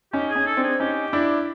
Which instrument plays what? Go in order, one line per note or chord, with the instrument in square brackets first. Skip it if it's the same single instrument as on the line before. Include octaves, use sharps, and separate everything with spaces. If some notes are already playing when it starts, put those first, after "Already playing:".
[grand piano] C#4 D#4 [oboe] G4
[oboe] G#4
[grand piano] C#4 D#4
[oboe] A4
[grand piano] C4 D4
[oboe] G#4
[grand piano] C#4 D#4 [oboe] G4
[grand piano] D4 E4